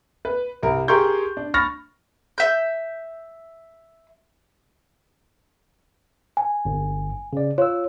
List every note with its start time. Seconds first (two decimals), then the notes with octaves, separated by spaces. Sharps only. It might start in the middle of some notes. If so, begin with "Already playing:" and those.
0.25 B4
0.63 C2 A#4
0.88 G4 G#4 A#4 C6 C#6 G6
1.37 D4
1.54 B5 C#6 F6 A6 A#6
2.38 E5 G6
6.37 G#5
6.65 G1
7.33 C#3 D5
7.58 F4 C#5 E6